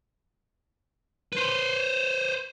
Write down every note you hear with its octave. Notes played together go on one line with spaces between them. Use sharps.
B4 C5